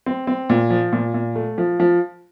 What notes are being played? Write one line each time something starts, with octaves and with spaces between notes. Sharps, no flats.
C4
C4
A#2
F3
A#2
A#2
A3
F3
F3